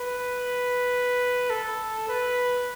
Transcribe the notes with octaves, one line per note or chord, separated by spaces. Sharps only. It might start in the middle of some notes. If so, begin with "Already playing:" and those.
Already playing: B4
A4
B4